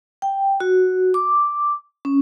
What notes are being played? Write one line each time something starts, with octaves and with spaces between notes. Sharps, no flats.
G5
F#4
D6
C#4